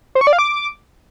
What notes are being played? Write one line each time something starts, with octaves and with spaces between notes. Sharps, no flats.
C5
C#6
D5
F5
D6